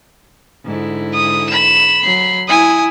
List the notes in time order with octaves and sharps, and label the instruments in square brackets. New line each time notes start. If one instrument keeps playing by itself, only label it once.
[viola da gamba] G#2 D3 E4
[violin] D#6
[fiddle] B5 [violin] E7
[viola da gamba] F#3 [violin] C7
[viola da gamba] E4 [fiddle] G#5 [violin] D#6